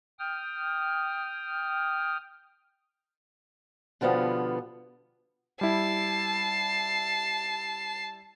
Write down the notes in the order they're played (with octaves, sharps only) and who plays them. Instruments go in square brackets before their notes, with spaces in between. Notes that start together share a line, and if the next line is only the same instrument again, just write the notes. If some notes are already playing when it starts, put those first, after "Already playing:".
[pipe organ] G5 D#6 F6
[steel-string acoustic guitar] B2 D3 F3 G3 B3 F4
[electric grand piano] G3 E4 [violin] A5 C7